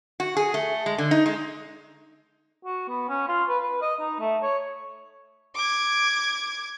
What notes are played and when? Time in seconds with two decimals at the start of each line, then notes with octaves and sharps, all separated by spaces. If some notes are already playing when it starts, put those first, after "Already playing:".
0.20 F#4
0.36 G#4
0.54 A3
0.86 G#3
0.98 D3
1.11 D#4
1.26 G#3
2.65 F#4
2.89 B3
3.09 C#4
3.28 F4
3.48 B4
3.63 B4
3.82 D#5
4.00 D#4
4.20 A3
4.42 C#5
5.56 D6 G#6